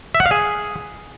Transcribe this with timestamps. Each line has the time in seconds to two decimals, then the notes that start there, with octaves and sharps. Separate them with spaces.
0.15 E5
0.20 F#5
0.26 F5
0.31 G#4